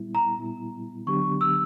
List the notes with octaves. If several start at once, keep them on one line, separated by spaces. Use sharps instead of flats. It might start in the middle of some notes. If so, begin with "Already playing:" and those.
Already playing: A#2 G3 B3 E4
A#5
A#2 G3 B3 E4
D3 F#3 B3 D4 G4 C#6
E6